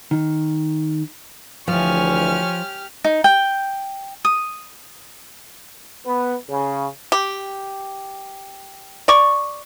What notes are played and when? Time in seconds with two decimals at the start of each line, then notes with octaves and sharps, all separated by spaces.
0.11 D#3
1.68 D2 E3 F3 G4 C#5 G#5 F6
3.04 D#4
3.24 G5
4.25 D#6
6.06 B3
6.50 C#3
7.12 G4
9.08 D5 C#6